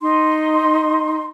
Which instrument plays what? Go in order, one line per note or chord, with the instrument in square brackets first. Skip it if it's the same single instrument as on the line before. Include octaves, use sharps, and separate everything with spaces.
[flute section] D#4 C6